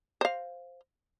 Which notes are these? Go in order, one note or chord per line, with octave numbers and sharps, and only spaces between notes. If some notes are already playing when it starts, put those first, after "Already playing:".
C5 F5